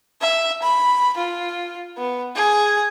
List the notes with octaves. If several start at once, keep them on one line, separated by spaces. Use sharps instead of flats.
E5
B5
F4
B3
G#4